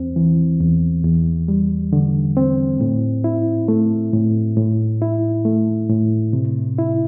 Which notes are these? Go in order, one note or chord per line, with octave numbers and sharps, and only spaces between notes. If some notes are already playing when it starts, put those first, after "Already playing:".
Already playing: E2 C4
E3
E2
E2
G3
D3
C4
A2
E4
A3
A2
A2
E4
A3
A2
C3
E4